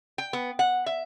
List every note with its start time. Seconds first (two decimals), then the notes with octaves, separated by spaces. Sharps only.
0.18 G5
0.33 B3
0.59 F#5
0.86 E5